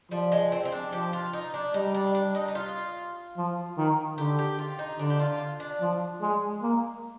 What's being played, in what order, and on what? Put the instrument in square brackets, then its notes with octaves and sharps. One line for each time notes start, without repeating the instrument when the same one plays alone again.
[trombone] F3 [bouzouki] G3
[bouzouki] G#3
C4
C4
D4
[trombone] F3 [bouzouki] G4
[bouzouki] F4
D#4
D4
[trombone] G3 [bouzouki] D#4
[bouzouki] D4
D4
D#4
D#4
F4
[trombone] F3
D#3
[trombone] D3 [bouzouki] G4
[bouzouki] G4
F4
D#4
[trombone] D3 [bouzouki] D4
[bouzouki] G4
F4
D4
[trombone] F3
G#3
A#3